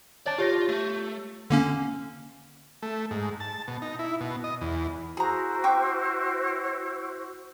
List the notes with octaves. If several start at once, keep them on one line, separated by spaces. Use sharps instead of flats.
C#5 D5 A5 A6
F4 G4 C#5 A#6
A3
D3 A#3 C#4
A3
G#2
A5
B2
D#4
E4
B2
D#5
E2
E4 F#4 G#4 C5 A#5
G5 C#6 D6